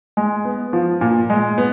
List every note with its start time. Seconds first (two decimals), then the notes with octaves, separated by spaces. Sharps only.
0.17 G#3
0.45 B3
0.73 F3
1.01 A#2
1.30 G#3
1.58 B3